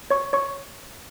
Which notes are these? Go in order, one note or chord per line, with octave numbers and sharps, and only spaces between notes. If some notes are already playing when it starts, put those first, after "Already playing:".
C#5 C#6
C#5 C#6